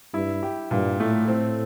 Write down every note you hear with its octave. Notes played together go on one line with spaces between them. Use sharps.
G2 E4
G4
G2 A#2
A2 A3
A2 C4